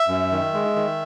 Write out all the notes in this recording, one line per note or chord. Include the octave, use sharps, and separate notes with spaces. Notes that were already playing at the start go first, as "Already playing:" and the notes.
Already playing: E5
F#2
D#3
G#3
D#3